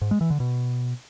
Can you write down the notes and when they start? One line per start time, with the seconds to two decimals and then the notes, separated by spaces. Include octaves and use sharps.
0.01 G#2
0.11 G#3
0.21 E3
0.30 D3
0.40 B2